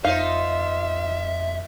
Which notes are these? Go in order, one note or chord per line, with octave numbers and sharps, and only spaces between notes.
F2 D#4 F4 C5 E5 F5